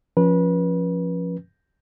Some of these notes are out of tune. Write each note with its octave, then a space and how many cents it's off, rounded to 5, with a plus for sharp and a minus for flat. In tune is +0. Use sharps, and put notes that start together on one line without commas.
F3 +0 C#4 +0 B4 -30